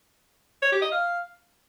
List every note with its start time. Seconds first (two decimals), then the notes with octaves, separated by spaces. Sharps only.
0.62 C#5
0.72 G4
0.82 D#5
0.92 F5